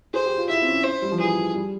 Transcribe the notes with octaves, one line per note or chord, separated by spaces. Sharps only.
G#4 C5
G4
F4
E4 E5
C4
C#4
C5
G3
F3
E3 G#4
G3